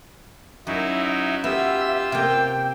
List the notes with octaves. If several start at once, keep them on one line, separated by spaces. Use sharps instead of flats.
F#2 F#3 D#4 E4 E5
B3 F4 G4 E5 E6
C3 A#3 G5